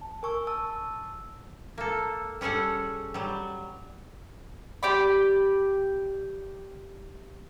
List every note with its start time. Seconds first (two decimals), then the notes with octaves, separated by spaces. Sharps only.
0.01 A5
0.23 A#4 G#5 C#6 E6
0.47 A5 E6
1.78 A#3 A4
2.41 G3 C#4 G#4 A4 F#5
3.14 F#3 G3
4.83 G4 D5 B5